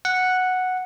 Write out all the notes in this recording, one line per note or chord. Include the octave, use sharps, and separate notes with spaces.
F#5